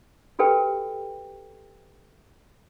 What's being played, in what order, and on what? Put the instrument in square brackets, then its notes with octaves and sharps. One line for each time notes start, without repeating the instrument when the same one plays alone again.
[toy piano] F#4 G4 A4 B4 G5